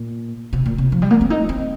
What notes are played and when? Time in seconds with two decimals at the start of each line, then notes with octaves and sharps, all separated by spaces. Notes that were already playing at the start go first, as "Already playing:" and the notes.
Already playing: A#2
0.53 C3
0.66 A#2
0.78 C3
0.92 F3
1.02 G3
1.10 A#3
1.21 C4
1.30 D#4
1.49 C4